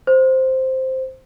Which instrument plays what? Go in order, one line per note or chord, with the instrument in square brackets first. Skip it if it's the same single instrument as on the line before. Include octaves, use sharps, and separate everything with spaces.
[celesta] C5